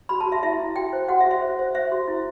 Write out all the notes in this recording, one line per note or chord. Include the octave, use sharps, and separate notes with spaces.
F#4 B5
A5
F#4
E5
E4 E5
E4
F#4 G5
C5
F#4 F#5
E5
F#4
E5
C5
C5
C5 E5
F#4
E4